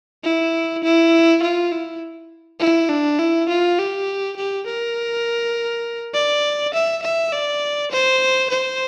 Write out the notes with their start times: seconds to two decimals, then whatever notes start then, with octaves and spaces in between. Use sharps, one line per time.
0.24 E4
0.84 E4
1.43 F4
1.72 E4
2.60 E4
2.89 D4
3.19 E4
3.49 F4
3.79 G4
4.37 G4
4.67 A#4
6.14 D5
6.74 E5
7.02 E5
7.32 D5
7.92 C5
8.50 C5